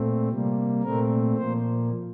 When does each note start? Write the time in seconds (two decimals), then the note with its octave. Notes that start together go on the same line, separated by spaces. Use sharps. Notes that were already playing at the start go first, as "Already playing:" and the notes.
Already playing: A#2 A3 C4
0.28 C3 G3 A#3
0.83 A#2 A3 C4 A#4
1.37 A#2 F3 A#3 C5